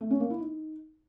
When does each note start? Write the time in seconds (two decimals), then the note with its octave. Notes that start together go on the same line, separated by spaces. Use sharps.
0.01 A3
0.10 C#4
0.20 A#3
0.30 E4
0.40 D#4